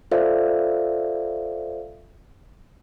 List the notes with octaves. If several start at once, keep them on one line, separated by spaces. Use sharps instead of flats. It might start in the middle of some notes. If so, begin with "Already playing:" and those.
F4 A4 C5 D5 E5 F5